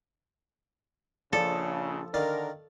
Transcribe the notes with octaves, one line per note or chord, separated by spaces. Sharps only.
A#1 C#3 F3 A4 D5
D3 D#3 A#4 D5 F5